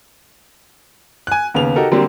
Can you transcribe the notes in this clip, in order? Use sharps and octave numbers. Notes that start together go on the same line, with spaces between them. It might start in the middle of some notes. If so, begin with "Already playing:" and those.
G#5 F#6
D#2 C#3 B3 F7
D#4 F#4 G4 A4 A#4
D3 F#3 G3 A#3 C4